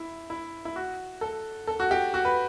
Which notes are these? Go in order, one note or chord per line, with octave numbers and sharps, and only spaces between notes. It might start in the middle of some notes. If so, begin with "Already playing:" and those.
Already playing: E4
E4
E4
F#4
A4
A4
F#4
G4
F#4
B4